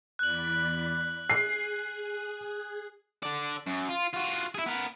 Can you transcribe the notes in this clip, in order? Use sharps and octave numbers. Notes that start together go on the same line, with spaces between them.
E2 D5 B5 F#6 F#7
G#4 C7
D3 D5
F#2
F4
F4 F#4
E4 G#4
B3 A#4